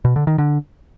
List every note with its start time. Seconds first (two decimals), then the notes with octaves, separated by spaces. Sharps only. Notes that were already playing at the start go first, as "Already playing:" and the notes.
0.05 B2
0.16 D3
0.27 D#3
0.38 D3